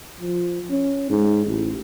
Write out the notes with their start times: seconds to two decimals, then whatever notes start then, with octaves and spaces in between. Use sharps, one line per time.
0.21 F3
0.70 C#4
1.10 G#2
1.46 A1